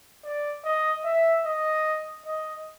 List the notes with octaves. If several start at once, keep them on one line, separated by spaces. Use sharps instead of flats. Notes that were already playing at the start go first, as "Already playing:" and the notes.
D5
D#5
E5
D#5
D#5